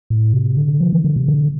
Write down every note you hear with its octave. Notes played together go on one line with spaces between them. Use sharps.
A2
C3
D3
F3
E3
D3
C3
D3